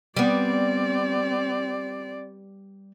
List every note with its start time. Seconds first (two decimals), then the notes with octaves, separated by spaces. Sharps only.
0.17 G3 B3 C4 D5